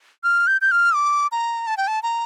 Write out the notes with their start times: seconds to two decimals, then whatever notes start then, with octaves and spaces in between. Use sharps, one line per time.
0.24 F6
0.47 G6
0.61 G6
0.71 F6
0.95 D6
1.32 A#5
1.67 A5
1.77 G5
1.88 A5
2.03 A#5